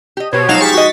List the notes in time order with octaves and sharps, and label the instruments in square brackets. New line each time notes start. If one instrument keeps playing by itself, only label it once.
[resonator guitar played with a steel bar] G4 D#5
[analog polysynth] B2 [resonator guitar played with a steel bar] G4 C5 [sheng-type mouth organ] C#5
[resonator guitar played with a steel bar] F3 G#3 D#4 [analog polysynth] F#3 F5 E7
[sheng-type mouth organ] G4 G#4 [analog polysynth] C#6 A6 B6
[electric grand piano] F#4 D#5